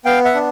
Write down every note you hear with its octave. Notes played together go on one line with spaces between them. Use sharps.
B3 F5 G5
E5 F#5
D4